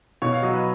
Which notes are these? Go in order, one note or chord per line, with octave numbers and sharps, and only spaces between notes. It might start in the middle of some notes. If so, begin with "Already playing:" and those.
B2 C#5
F5
F#3 D#5
B4